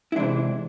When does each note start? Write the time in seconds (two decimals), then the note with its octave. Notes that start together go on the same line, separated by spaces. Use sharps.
0.12 E4
0.16 C3 E3 G#3 D4